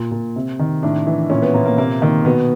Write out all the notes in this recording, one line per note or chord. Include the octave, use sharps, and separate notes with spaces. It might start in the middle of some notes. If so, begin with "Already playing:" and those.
Already playing: A#2
A#2
C3
D#3
A2 D4
E3
A#2 C#4
B3
A#2 A#3
A#3
C3 A#3
D#3 A#3
B2 B3